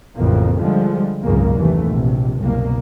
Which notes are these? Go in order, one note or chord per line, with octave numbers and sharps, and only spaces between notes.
A1 F2 C#3 A#3
D3 F3 G3 G#3
G#1 C#2 F#2 C#3 A#3
A1 D#2 C3 E3 A3
A#1 C3
F#1 C2 B2 A#3